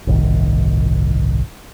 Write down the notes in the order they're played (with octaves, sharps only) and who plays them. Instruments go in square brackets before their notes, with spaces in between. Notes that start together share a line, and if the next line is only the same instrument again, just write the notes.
[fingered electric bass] G1 C2 A2 D#3